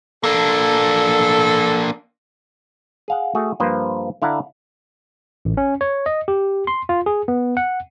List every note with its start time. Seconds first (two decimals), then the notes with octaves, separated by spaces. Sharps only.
0.23 A#3 D4 A4
3.08 G#4 F5 F#5
3.35 A3 F#4 G#4
3.60 G2 F3 A#3 B4 C5
4.22 D3 E4 F5 F#5 A5 A#5
5.45 A1
5.57 C#4
5.81 C#5
6.06 D#5
6.28 G4
6.67 C6
6.89 F4
7.06 G#4
7.28 B3
7.57 F#5